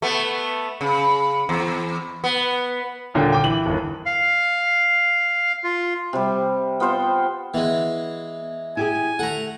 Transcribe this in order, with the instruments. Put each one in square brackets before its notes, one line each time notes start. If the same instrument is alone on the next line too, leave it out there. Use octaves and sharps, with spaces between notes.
[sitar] A3 B3
C#3
E2
B3
[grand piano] D#1 A#2 D3 G5
G5 D6
E3 F#7
G1 D#2
[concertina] F5
F4
[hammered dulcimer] C3 G3
B3 F4 C5 G5
[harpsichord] E3 G#3 [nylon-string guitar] B3
[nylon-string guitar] E4 G4 G#4 [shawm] G#5
[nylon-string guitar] A3 A4 [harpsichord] F#5 A#5